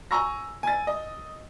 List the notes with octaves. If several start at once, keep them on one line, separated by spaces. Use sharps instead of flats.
G#5 A#5 C#6 E6 A#6
G#5 A6
D#5